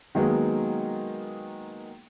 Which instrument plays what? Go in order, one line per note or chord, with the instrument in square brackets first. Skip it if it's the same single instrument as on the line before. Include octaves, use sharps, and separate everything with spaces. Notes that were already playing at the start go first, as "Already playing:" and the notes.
[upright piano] D#3 F#3 G#3 A#3 B3